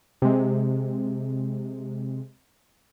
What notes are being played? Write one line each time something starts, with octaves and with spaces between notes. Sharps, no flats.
C3 G#3